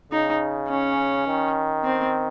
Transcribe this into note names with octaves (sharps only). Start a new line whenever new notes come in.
C#3 D#4
C#4
D#3
C4